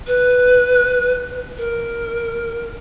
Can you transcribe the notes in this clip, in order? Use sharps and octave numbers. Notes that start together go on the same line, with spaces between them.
B4
A#4